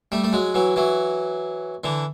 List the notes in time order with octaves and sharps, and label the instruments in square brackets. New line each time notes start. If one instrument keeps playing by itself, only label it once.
[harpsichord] G3 A3
A3
F#3 G#3
E3 F#3
E3 F#3
D3 E3